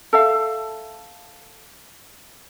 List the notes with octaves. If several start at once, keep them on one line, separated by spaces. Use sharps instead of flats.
A4 E5 F5